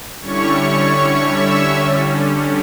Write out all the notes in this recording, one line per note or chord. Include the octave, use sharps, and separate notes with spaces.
D3 G3 C#4 E4 C#5 C#6
C#5 C#6
E5 E6
D3 G3 C#4